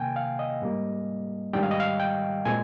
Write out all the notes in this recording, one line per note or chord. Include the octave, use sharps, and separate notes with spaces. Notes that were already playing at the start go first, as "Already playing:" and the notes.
Already playing: C3 D#3 A#3 G5 G#5
F5
D#5
G#2 G3 A#3
G#2 D#3 G3 G5
F5
D#5
F5
G5
A#2 G#3 C4 G#5